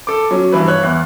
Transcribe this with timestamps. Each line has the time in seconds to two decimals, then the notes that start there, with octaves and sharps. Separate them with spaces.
0.07 A4 D6
0.31 F#3 C#4
0.52 G2 E3 B4
0.68 C#5 F#6
0.83 E2